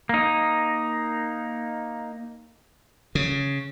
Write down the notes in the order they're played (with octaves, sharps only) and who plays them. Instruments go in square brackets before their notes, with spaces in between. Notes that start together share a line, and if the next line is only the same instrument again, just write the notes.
[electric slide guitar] A#3 D#4
[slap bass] C#3